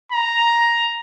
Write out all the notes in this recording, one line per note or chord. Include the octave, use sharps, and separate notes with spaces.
A#5